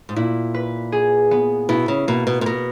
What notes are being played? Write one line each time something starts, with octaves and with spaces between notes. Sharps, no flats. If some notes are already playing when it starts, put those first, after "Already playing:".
G#2
A#2 E4
B4
G#4
B3
B2 E4
C#3
B2 A#3
B2
A#2
B2 A#4